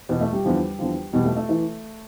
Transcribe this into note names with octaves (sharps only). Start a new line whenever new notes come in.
E2 B2 B3
A3
G3
E2 D3 F3
E2 D3 F3
E2 B2 G3
A3
A3
E3